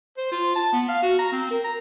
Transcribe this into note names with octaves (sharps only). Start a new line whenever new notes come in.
C5
F4
A5
B3
F5
F#4
A#5
C4
A#4
A#5